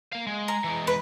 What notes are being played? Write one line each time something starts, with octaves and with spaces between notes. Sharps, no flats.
A#3 F5
G#3
A#5
E3 G#3
B4